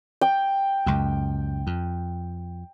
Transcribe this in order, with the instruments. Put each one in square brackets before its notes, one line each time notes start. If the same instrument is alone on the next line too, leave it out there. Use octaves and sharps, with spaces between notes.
[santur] G5
[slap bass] C#2 F#2
F2